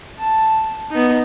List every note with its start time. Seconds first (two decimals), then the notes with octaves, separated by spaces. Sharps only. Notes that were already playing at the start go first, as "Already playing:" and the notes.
0.18 A5
0.91 B3 D#4